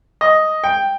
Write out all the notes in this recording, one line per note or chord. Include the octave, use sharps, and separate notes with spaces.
D#5
G5